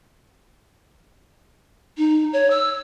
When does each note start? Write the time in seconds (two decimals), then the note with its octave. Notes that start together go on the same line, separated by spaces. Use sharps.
1.98 D#4
2.33 C#5
2.50 E6